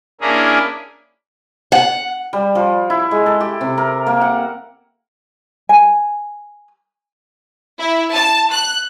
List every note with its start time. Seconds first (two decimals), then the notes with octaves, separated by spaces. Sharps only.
0.21 A#3 C#4 D4 E4 G#4 A#4
1.72 F#5
2.33 G3
2.55 F3
2.90 E4
3.11 G#3
3.26 A4
3.41 G4
3.61 C3
3.78 A#4
4.07 A#3
4.21 F#5
5.69 G#5
7.79 E4
8.13 A5
8.52 F#6